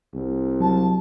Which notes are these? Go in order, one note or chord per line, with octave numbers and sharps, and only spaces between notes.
C2
F#3 A5